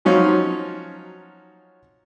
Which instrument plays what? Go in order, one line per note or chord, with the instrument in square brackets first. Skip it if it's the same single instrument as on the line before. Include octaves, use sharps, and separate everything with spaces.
[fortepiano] F3 F#3 C#4 D#4 F4